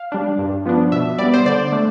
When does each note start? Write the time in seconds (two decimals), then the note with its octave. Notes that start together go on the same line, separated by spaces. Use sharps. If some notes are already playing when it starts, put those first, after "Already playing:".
Already playing: F5
0.12 G3 D4
0.38 G2
0.65 F3 B3 D4
0.92 B2 E5
1.19 G3 B3 D5
1.34 C5
1.46 D3 D5
1.72 A3 D4